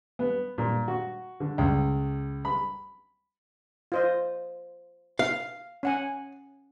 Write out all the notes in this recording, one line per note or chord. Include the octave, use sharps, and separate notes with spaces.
B3
A#2
F#4
D3
C#2
B5
F4 C5 D#5
F5
C#4 F#5 G#5